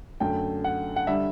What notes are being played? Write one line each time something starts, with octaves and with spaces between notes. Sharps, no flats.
F#2 D3 A3 G5
F#5
F#5
D3 G3 E5